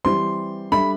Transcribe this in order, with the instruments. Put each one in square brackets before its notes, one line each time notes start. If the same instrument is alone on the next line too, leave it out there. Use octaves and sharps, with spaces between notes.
[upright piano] E3 G3 C4 G4 C5 [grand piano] C6
[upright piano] G3 D4 A4 E5 [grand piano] B5